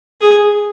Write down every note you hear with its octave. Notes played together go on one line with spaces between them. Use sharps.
G#4